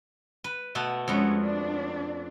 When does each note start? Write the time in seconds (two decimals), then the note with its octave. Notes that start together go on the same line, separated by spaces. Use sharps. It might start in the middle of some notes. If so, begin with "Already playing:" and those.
0.44 B4
0.75 B2 A3 B3
1.08 F2 G#3 B3 C#4
1.43 D4